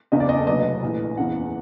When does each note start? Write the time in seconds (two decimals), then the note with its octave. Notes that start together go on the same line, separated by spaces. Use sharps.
0.12 F#1 E2 C#3 D#5
0.20 D5
0.29 D#5
0.38 A4
0.47 F1 D#2 D3 F#3 B3 D#5
0.83 A#1 A2 E3
1.17 F#1 E2 C#3 E3 F#5